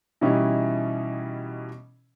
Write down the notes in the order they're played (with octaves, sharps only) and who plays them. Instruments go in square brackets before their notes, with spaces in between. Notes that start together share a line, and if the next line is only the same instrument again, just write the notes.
[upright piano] B2 E3 G3 C#4 D#4 E4